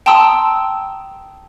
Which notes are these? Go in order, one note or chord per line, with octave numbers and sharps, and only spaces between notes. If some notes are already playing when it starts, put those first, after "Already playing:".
G5 A5 A#5 C6 D#6 E6